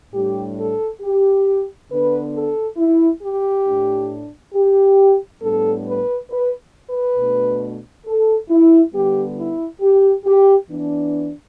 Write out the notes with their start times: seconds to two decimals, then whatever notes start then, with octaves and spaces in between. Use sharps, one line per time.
0.13 A2 G3 D4 G4
0.57 A4
1.01 G4
1.89 D3 B3 D4 B4
2.34 A4
2.77 E4
3.21 G4
3.66 A2 A3 D4
4.53 G4
5.40 A2 G3 B3 D4 A4
5.85 B4
6.30 B4
6.88 B4
7.16 B2 A3 D4
8.05 A4
8.49 E4
8.93 D3 G3 B3 G4
9.36 E4
9.81 G4
10.24 G4
10.69 E3 B3 D4